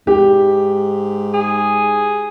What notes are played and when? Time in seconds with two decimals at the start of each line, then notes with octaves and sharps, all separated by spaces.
0.07 G#2 G4
1.34 G#4